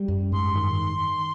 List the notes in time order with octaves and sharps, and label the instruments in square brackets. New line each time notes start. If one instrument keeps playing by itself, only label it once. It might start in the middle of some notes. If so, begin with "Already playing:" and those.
Already playing: [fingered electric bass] G3
F#2
[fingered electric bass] G#2 [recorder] C6
[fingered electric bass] D#3